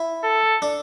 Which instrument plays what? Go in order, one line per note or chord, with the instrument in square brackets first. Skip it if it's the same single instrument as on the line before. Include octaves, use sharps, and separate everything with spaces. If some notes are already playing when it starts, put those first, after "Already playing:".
Already playing: [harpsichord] E4
[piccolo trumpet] A4
[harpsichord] D4